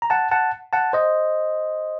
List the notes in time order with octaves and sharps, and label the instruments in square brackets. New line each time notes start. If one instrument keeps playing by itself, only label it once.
[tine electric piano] A#5
F#5 A5
F#5 A5
F#5 A5
C5 D#5